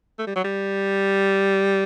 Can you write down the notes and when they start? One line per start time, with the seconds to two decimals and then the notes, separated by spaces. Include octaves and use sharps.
0.19 A3
0.27 G3
0.35 F#3
0.44 G3